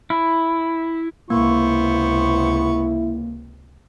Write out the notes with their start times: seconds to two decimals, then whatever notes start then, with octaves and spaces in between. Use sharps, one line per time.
0.10 E4
1.30 C#2 C3 A#3 B3 E4 C5 C#6